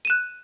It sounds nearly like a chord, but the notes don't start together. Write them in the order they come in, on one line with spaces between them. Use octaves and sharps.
D#7 E7 F#6